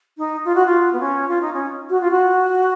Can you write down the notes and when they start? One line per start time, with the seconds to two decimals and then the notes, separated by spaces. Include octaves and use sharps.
0.18 D#4
0.45 F4
0.55 F#4
0.66 F4
0.93 B3
1.00 C#4
1.28 F4
1.41 D#4
1.53 C#4
1.90 F#4
2.01 F4
2.11 F#4